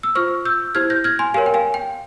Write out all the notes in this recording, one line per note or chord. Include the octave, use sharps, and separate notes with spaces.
E6
F4 C5 C#6 F6
E6 G6
E4 G4 C5 F6 G#6
G6 A#6
F6 G#6
G#5 C6
G4 A#4 C#5 F5 G#5
G5
F5 G#5
G5